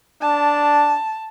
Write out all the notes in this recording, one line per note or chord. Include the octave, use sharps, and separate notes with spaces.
D4 A5